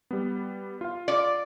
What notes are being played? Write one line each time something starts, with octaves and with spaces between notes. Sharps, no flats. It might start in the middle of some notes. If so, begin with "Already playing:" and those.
G3 B3
F4 F5
D5